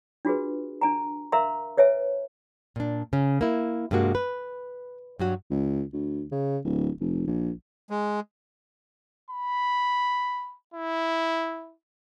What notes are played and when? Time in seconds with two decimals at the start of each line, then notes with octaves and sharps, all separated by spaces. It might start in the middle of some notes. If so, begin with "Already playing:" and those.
0.25 D4 F4 F#4 G#4 B4
0.81 D4 G#5 A#5
1.32 A#4 E5 F5 A#5 C6
1.77 B4 C#5 E5 G#5
2.76 A#2 D4
3.13 C#3 C#4
3.41 A#3 E4
3.91 G2 C3 G#3 A#3 F#4
4.15 B4
5.19 G2 F#3 F#4
5.50 C#2
5.93 D2
6.31 C#3
6.64 D1
7.00 F1
7.27 A#1
7.90 G#3
9.31 B5
10.74 E4